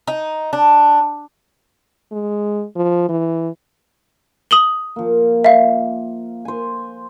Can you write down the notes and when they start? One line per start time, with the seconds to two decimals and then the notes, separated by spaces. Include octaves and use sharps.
0.07 D#4
0.53 D4
2.12 G#3
2.76 F3
3.09 E3
4.51 D#6 F#7 G7
4.96 F3 A#3
5.44 E5 F5
6.45 C5 G#5